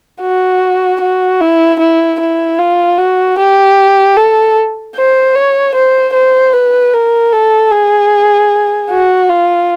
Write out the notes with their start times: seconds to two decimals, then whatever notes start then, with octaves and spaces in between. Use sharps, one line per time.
0.22 F#4
1.01 F#4
1.41 E4
1.80 E4
2.20 E4
2.59 F4
2.98 F#4
3.38 G4
4.17 A4
4.95 C5
5.35 C#5
5.75 C5
6.13 C5
6.53 B4
6.93 A#4
7.32 A4
7.71 G#4
8.90 F#4
9.29 F4